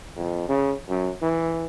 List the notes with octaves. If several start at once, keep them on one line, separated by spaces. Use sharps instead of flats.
F2
C#3
F#2
E3